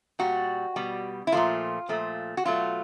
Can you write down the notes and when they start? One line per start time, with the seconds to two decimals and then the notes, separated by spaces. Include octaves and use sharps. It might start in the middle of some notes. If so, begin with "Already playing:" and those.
0.19 A#2 G3 F#4
0.76 B2 G3
1.27 E4
1.32 A#2 F3 A3 F4
1.89 A#2 F3 A3
2.37 F#4
2.45 B2 F#3 A3 F4